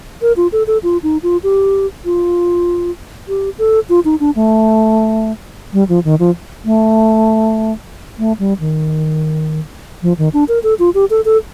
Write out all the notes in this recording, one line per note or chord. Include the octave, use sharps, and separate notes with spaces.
A#4
F4
A4
A4
F4
D#4
F4
G4
F4
G4
A4
F4
D#4
D4
A3
G3
F3
D#3
F3
A3
A3
G3
D#3
F3
D#3
D4
A#4
A4
F4
G4
A4
A4